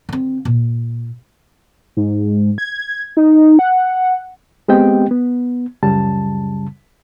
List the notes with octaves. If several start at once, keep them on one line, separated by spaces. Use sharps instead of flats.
D3 C4
A#2
G#2
G#6
D#4
F#5
G#3 B3 C4 G4 D#5 G5
B3
C#2 F#2 C#3 G3 A5